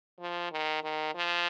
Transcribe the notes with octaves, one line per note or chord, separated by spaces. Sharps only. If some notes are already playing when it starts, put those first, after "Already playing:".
F3
D#3
D#3
F3